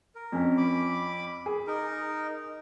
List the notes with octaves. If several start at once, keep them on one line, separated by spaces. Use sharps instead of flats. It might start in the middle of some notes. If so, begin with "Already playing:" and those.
A#4
F2 C#4
B5 D6
G#4
D#4 A#4